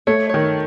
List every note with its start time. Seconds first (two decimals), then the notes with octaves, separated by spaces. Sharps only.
0.07 A3 C#5
0.29 D#3 C#5